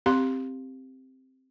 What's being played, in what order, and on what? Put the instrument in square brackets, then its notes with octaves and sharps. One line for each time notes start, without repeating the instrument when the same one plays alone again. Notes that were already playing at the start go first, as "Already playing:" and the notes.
[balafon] C4 G4 F5 C6